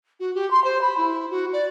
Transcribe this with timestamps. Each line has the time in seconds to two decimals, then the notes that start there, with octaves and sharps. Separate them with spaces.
0.20 F#4
0.35 G4
0.51 C6
0.64 C5
0.81 B5
0.97 E4
1.30 F#4
1.53 D5